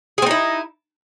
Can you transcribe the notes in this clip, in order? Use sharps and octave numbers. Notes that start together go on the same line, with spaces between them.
C4 D#4 E4 G#4